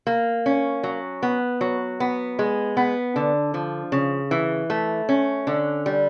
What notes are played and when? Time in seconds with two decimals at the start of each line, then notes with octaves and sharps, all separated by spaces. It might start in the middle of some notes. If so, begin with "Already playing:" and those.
0.07 A#3
0.46 C#4
0.83 F#3
1.23 B3
1.61 F#3
2.00 B3
2.39 G#3
2.77 B3
3.16 D3
3.54 F3
3.92 C#3
4.31 E3
4.70 A3
5.09 C#4
5.47 D3
5.86 G3